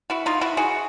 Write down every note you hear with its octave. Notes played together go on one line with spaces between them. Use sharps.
E4 F#4
D#4 F4
E4 F#4
F#4 G#4